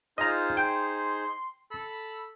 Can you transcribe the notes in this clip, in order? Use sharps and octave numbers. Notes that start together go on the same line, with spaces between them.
D#4 F4 G#4 C5 D#5 A#5
G5 C6
A4 B5